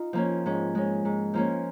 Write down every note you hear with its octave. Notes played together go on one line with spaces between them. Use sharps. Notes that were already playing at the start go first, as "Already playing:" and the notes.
Already playing: D#4 F4
F3 A#3 C#4
G#2 C#4
G#3 C#4
G#2
F3 A#3 C#4